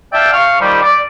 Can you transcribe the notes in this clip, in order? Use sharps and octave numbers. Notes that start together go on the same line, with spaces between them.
D5 E5 F5 G5 A5
F5 C#6
D#3 F3 G3
D5